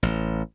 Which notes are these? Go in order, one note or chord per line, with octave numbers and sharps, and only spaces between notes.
A1